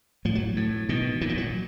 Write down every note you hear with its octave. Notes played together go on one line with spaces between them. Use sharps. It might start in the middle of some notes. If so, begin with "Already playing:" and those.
A2 F3
F#3
A2
B2 D#3
A#2 E3
F3
F#3